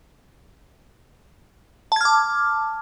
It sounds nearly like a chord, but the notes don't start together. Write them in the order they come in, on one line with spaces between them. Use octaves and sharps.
A5 G#6 F6 D6